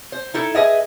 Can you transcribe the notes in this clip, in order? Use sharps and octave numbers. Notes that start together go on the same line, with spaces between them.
C5
D#4 E4 A4
G#4 B4 D#5 E5